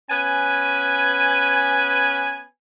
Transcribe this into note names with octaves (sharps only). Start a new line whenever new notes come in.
B3 C#4 B4 G#5